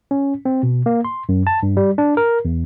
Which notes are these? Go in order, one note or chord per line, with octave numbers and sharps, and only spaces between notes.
C#4
C4
B2
A#3
C6
F#2
A5
G2
G3
D4
A#4
E2